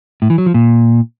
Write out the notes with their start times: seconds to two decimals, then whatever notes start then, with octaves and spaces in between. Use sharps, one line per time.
0.22 A2
0.30 E3
0.38 F#3
0.46 F3
0.54 A#2